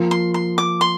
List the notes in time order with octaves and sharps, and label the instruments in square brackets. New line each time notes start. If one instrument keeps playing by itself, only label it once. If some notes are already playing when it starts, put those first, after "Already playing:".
Already playing: [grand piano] F3 A#3 F4
[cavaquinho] C6
C6
D6
C6